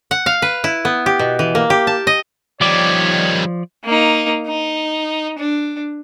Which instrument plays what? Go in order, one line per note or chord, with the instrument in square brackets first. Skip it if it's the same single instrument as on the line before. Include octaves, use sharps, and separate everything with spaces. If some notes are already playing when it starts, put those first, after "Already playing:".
[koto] F#5
F5
B4
E4
B3
G4
B2
E3
A#3
G4
A5
D#5
[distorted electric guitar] D#3 G3 [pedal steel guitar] F3 D5 D6 [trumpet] C#5
[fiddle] A#3 D#4
D#4
D4